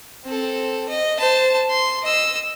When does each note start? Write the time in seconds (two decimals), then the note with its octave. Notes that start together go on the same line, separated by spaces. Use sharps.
0.24 C4 A4
0.89 D#5
1.19 C5 A5
1.70 C6
2.03 D#5 E6